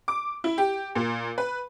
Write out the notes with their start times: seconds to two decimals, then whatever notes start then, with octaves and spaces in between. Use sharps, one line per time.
0.08 D6
0.44 E4
0.58 G4
0.95 A#2
1.38 B4